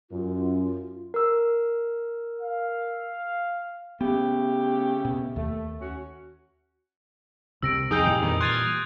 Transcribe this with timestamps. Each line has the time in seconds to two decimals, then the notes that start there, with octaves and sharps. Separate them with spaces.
0.11 F#2 F4
1.14 A#4 E6
2.41 F5
4.01 C#3 A3 B3 G4
5.05 B2
5.36 D#2 A3
5.80 C#4 F#4
7.62 C2 C3 E6 A#6 D7
7.91 F2 D#4 G#4 G5 D#6 G6 F7
8.07 A#2 E3 G3
8.22 F2 D#3 D#4
8.41 C6 D#6 F6 F#6 G#6 A6